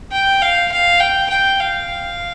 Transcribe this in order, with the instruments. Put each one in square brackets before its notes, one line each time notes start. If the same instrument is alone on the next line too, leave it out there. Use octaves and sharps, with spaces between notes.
[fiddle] G5
F5
F5
G5
G5
F5